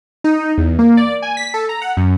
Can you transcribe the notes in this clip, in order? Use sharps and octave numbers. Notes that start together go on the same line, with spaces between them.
D#4
E2
A#3
D5
G#5
B6
A4
A#5
F#5
F#2